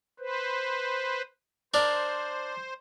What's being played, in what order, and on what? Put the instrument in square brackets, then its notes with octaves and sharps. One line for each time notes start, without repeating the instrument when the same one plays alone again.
[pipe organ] B4 C5
[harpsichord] D4 A#4 [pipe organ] C5